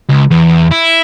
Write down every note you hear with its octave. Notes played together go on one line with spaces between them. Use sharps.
C#2
E2
E4